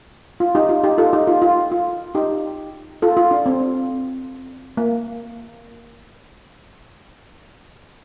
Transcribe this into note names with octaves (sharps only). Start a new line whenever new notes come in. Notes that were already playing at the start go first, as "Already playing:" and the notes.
F4
D#4 G4
F4
D#4 G4
F4 A4
D#4 G4
F4
F4
F4
D#4 G4
F4 A4
F4
D4
C4
A#3